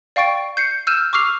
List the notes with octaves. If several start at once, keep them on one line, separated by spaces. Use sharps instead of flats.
D5 F5 G5 C#6 A6 D7
G6 C7 C#7
E6 F6 G6 D#7 E7
C#6 D6 E6 F6 C7 F7